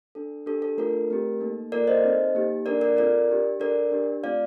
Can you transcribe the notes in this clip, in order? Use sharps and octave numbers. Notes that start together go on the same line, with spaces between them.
D4 A4
D4 G4 A4
A4
A3 D4 F4 A4 A#4
A3 C4 G4
A#3 D#4 A4
A#3 F4 A4 A#4 D5
C5 D#5
C4 D#4 A4
A#3 D#4 G4
A#3 D4 A4 A#4 D5
A#4 D5
C4 F4 A4 A#4 D5
D4 G4
D4 A4 A#4 D5
D4 G4
A3 C4 F4 D5 F5